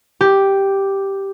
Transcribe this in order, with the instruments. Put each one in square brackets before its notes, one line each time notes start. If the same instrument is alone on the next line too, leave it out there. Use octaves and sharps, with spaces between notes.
[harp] G4